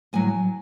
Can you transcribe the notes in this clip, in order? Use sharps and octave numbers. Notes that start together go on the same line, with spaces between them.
A2 F#3 G#5